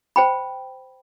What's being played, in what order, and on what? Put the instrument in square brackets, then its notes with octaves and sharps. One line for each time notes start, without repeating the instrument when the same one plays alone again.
[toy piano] C5 G5 B5